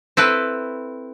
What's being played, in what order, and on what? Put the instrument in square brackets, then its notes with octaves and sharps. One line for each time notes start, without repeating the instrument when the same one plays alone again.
[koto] C4 E4 A4 B4